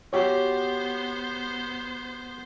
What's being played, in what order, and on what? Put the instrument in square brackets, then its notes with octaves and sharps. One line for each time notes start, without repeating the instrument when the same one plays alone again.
[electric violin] B3 C5 [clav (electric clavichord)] F#4 G4 C#5